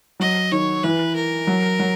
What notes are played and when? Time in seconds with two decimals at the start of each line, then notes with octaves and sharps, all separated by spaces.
0.20 F#3 D#5
0.51 D#3 C#5
0.83 E3 B4
1.15 A#4
1.47 F#3
1.79 F#3